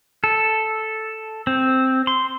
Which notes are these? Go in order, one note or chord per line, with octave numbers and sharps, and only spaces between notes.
A4
C4
C6